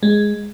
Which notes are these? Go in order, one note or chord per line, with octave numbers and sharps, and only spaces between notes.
G#3